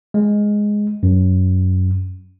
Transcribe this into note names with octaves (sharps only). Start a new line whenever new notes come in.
G#3
F#2